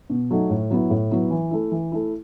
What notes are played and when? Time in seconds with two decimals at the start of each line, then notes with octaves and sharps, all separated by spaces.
0.10 B2
0.31 F#3 A3 D#4
0.50 A2
0.70 F#3 B3 E4
0.90 A2
1.11 F#3 B3 E4
1.30 E3
1.51 A3 E4
1.71 E3
1.92 A3 E4